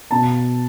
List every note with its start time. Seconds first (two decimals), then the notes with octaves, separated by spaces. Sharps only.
0.11 B2 A5